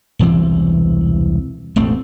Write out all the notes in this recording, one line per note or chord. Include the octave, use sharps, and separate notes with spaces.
E1 C2 E3 C4
E1 A1 A3 C4